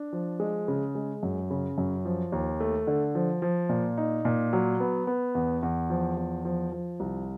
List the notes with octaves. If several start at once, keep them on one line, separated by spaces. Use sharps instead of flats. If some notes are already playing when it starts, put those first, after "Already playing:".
Already playing: D4
F3
G#3
C#3
G#3
F#2
C#3
F#2
F3
D#2
A3
D3
F3
F3
A#2
D#4
A#2
F#3
B3
B3
E2
E2
F3
E2
F3
F3
C2